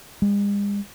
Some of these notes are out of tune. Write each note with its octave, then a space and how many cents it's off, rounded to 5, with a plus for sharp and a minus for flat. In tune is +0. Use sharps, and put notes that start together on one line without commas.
G#3 -45